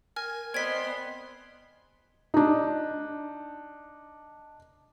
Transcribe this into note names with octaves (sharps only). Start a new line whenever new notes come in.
A#4 G#5 F6
B3 C4 D5 D#5 C6 G#6 B6
D4 D#4